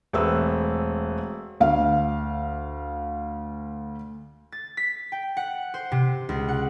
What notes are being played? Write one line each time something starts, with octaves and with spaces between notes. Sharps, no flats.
E1 A3 C4 B4 E6
D2 F5
A6
B6
G5
F#5
C5
C3
C#2
F#5